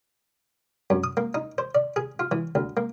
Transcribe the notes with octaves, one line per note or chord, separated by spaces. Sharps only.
F#2
D#6
A#3
D#4
C5
D5
G#4
F4
E3
D2
A#3